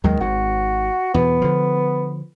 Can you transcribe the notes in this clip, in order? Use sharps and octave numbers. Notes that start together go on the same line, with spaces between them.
D#2 D#3 F#3 G#3
G#1 G#2 F#4
E2 B2 B3
D3 F3